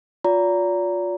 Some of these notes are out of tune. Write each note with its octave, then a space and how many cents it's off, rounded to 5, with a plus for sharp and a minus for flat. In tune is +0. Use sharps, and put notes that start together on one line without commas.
F4 +30 D5 -40 A#5 -5